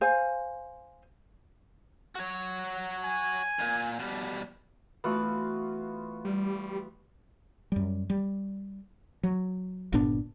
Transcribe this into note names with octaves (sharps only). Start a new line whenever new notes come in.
C5 F5 G#5
F#4 C#5
G#5
D2 A#2
B2 G3
E3 A3 B3 F4 F#4
G3
F#2 G3
G3
F#3
G1 A#2 B3 D4